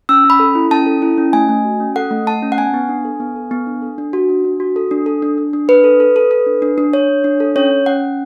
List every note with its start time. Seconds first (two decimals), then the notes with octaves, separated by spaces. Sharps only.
0.09 C#4 E6
0.24 C#4
0.30 B5
0.40 A4
0.55 E4
0.71 C#4 A5
0.86 A4
1.02 E4
1.18 C#4
1.33 A3 G#5
1.49 A3
1.65 F#4
1.80 C#4
1.96 A4 F#5
2.11 A3
2.27 A3 A5
2.43 C#4
2.52 F#5
2.58 B3 G#5
2.74 B3
2.89 D4
3.05 A4
3.20 B3
3.36 A4
3.51 B3
3.67 D4
3.82 A4
3.98 D4
4.13 F#4
4.29 D4
4.45 D4
4.60 F#4
4.76 A4
4.91 D4
5.06 A4
5.22 D4
5.38 D4
5.53 D4
5.68 D4 B4
5.84 A4
6.00 A4
6.16 A4
6.31 A4
6.46 D4
6.62 D4
6.78 D4
6.93 D4 C#5
7.09 D4
7.24 D4
7.40 A4
7.56 C#4 C#5
7.71 C#4
7.86 C#4 F#5
8.02 C#4